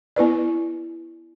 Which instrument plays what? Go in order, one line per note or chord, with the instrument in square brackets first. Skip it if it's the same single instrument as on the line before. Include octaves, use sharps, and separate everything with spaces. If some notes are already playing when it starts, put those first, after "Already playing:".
[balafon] B3 E4 B4 D5